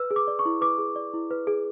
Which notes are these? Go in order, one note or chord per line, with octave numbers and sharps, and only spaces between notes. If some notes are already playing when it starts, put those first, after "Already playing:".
Already playing: B4 E6
G#4
D6
D5
C#6
E4
B4 D6
G#4
D5
E4
B4
G#4